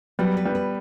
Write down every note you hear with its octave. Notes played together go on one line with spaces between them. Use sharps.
F#3 G3 B3
B4
G3 B3
B4